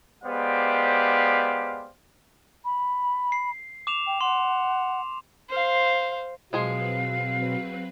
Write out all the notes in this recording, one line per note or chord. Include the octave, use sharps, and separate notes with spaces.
G#3 B3 G4 C5 D5 F5
B5
C7
D6 E7 F7
G5
F#5 C6
C5 F5
B2 F3 F#3 G#3 C4 G#4 B4 F5